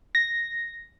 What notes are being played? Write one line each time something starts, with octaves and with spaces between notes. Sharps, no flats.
A#6